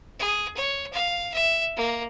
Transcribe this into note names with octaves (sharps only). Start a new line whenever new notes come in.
G#4
C#5
F5
E5
A#3